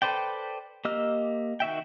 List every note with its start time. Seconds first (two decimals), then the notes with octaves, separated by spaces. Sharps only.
0.02 A4 B4 C5 D5 G5
0.85 A#3 G4 D#5 E6 F6
1.60 D#3 F#4 E5 G5